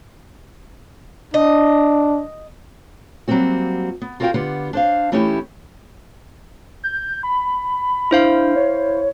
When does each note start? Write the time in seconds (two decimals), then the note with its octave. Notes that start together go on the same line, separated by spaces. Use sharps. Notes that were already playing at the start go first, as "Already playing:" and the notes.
1.34 D4 D#5
3.28 F#3 G3 A#3 C4 F#4
4.02 B3
4.20 F4 F#4 A#4 C#5 F5 G5
4.34 D3 B3 F4 G4 F#5
4.73 D4 C5 F5
5.12 E3 A3 C#4 D#4 E4 G4
6.84 G6
7.23 B5
8.11 D4 E4 C5 F5
8.56 C#5